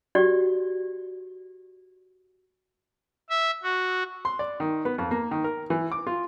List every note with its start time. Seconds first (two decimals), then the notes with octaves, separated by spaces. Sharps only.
0.15 F#4 G4 D5
3.30 E5
3.63 F#4
4.25 C6
4.39 D5
4.60 D#3
4.85 B3
4.98 F2
5.11 A#3
5.31 D#3
5.44 A#4
5.70 E3
5.92 D6
6.07 F4